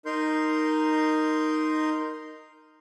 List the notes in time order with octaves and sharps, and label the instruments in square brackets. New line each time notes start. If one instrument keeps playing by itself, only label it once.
[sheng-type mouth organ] D#4 A#4 C6 G6